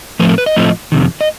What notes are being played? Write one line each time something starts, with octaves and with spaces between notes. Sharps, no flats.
A2 F3 A3 C4 B4
A#4
B4
D#5
A2 F3 A3 C4
F2 C3 D#3
D#5